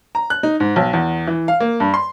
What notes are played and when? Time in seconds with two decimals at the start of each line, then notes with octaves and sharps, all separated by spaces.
0.15 A#5
0.30 F#6
0.43 D#4
0.60 G#2
0.76 B1
0.93 E2
1.28 E3
1.48 F5
1.60 A#3
1.80 G2
1.94 C6